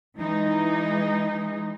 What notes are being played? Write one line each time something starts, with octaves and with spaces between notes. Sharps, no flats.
E3 G#3 D#4